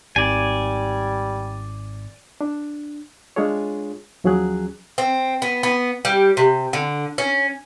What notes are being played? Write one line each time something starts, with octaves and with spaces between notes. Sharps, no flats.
G#1 G3 D5 G#5
D4
G#3 D4 F4 G#4 C#5
D#2 F3 F#3 C#4 G#4 F#6
C4
B3
B3
G3
C3
D3
C#4